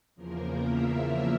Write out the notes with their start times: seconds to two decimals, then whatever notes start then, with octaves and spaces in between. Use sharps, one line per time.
0.16 E2 C#3 F3 A#3 A#4
0.65 E5